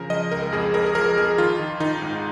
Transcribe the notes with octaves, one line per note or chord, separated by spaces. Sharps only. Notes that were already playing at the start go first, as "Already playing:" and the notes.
Already playing: C#3 F3 A#4
F3 D#5
C#2 A#4
F2 G#4
F2 A#4
G#4
F3 A#4
F2 G#4
D#3 F4
D#3
D#3 D#4
G#2